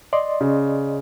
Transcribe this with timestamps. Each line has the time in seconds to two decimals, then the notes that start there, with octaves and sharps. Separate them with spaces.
0.13 D5 D#5 C6
0.41 C#3